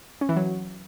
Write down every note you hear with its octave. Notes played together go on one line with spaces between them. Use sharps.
C#4
E3
F#3